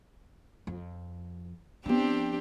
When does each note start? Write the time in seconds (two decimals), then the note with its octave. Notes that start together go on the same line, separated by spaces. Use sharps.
0.67 F2
1.86 F3 B3 C4 D4 G4